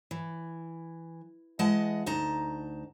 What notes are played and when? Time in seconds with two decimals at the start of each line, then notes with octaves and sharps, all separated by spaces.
0.11 E3
1.59 E3 G#3 D#5 F#5 A5
2.06 D2 D#4 A5 A#5